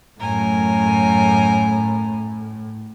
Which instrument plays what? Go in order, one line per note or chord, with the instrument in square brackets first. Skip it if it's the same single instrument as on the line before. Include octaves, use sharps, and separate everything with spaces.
[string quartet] F#2 A#4 G#5 [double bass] A2